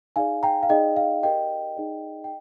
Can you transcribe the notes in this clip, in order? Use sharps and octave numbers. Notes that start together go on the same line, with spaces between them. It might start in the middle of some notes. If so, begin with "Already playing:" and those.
D#4 G#4 D5 F5 G#5
G5 A#5
F5
D#4 G#4 D5 D#5 G5
F5
G4 A#4 D5 D#5 G5
D#4 G#4 D5
G5